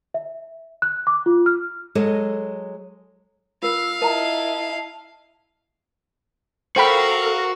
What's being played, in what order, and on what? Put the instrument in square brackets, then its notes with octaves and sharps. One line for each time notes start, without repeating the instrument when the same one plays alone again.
[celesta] E5
F#6
D6
F4
F6
[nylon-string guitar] F#3 G#3 A4 D#5
[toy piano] F4 A#4 [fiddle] F5 [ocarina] E6
[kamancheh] E4 D#5 [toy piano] A#4 G5 A#5 [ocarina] A5
[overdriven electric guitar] F#4 [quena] A4 [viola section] A#4 F5 A#5 [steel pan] C5 G5 B5